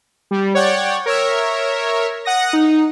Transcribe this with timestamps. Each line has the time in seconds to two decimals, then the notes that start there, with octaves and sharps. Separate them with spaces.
0.31 G3
0.55 C#5 D5 F#5 G5
1.06 A#4 C#5 E5
2.25 F#5 D#6 A#6
2.53 D#4